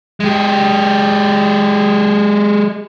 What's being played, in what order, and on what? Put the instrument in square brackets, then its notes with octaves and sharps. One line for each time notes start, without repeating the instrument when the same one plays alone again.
[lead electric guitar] G#3 G4